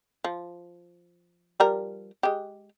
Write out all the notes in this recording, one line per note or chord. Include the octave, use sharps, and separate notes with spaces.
F3
F3 G3 A#4
G#3 G4